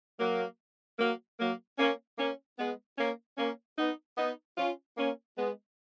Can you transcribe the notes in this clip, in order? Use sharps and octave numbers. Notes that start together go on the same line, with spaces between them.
F#3 A#3
F#3 A#3
F#3 A#3
A#3 C#4
A#3 C#4
G#3 B3
A#3 C#4
A#3 C#4
B3 D#4
B3 D#4
C#4 F4
A#3 C#4
G#3 B3